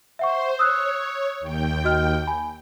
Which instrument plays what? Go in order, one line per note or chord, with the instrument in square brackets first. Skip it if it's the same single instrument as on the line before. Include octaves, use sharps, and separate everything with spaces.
[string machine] C5 [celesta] E5 F#5 C#6
[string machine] C#5 [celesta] D#6 E6 F#6
[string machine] D#2 G5
[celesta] F#4 D#5 F6
G#5 B5